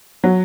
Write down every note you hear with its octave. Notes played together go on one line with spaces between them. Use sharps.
F#3